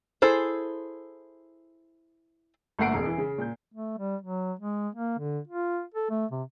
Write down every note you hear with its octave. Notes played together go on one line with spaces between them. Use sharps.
E4 G#4 A4 C5
G1 A3 A#3 F#5 C7 D7
E1 F2 G#4
E3
C#3
A#2 G6
A3
G3
F#3
G#3
A#3
D3
F4
A4
A3
C3